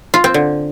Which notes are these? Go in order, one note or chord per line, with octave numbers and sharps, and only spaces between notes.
F4
C4
D3